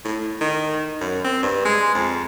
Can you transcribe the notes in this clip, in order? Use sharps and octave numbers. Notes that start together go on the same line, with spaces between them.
A2
D#3
F#2
C4
G2
G#3
F2